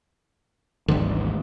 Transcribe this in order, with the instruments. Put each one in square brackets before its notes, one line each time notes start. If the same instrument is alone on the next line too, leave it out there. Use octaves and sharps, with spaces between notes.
[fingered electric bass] G#1 D2 G#3 [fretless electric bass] D3 E3 G3